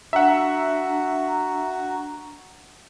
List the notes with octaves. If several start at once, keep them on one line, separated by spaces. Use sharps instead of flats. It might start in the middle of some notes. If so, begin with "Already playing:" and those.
D4 F#4 E5 F#5 A#5